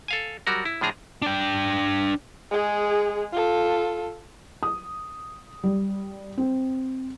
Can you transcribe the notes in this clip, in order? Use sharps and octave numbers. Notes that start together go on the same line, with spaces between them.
A4 F5 G#5
F#3 G3 F#4 A#4
E4
A2 F3 D4 G#4 A#5
D4 G5
G#3 G#4
F4 A4
D#6
G3
C4